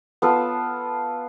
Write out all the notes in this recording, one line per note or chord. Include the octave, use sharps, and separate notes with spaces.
B3 F4 A4